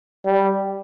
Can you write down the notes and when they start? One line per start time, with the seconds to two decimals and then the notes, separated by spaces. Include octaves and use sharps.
0.25 G3